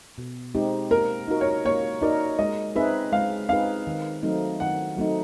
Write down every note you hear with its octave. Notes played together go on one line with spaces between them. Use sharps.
B2
G#3 C4 D#4 G4
A#3 A#4
D#4 F#4 A#4
C#5
A#3 C#5
D#4 F#4 A#4 D5
G#3 D#5
C4 D#4 G#4 B4 E5
G#3 F5
C4 D#4 G#4 B4 F5
D#3
F#3 A3 C4 D#4
D#3 F#5
F#3 A3 C4 D#4